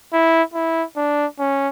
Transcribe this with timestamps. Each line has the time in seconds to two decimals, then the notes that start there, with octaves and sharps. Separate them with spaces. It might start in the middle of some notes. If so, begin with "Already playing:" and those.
0.13 E4
0.54 E4
0.97 D4
1.39 C#4